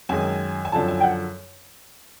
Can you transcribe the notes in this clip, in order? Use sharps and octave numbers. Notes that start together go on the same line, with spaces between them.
F#2 D#3 G#3 G#5
G#5
F#2 D3 F3 A5
G#5
G5
F#5